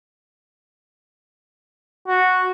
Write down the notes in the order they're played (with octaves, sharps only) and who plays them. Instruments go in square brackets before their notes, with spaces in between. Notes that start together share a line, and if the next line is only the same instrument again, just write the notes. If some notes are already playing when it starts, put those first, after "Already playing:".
[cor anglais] F#4